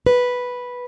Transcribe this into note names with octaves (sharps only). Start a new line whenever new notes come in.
B4